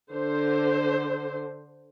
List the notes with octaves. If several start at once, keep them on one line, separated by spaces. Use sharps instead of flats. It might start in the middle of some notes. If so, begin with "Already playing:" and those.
D3 C5